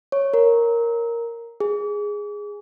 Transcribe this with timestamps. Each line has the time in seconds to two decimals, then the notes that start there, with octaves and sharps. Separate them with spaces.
0.12 C#5
0.34 A#4
1.60 G#4